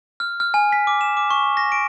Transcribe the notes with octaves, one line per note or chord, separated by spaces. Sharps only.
F6
F6
G#5
B6
D6
E7
D6
C#6
A#6
D7